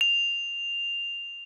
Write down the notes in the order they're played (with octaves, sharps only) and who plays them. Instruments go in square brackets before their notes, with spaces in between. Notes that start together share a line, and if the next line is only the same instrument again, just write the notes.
[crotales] F7